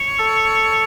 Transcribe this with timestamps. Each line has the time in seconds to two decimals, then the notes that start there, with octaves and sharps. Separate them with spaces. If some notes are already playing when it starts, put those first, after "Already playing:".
Already playing: C#5
0.19 A4